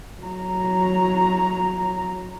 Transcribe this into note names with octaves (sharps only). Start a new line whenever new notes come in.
F#3 A#5